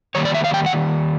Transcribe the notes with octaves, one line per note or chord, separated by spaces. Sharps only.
D#3 G3 A#3 C#5
D5
E5
F5
G5
F#5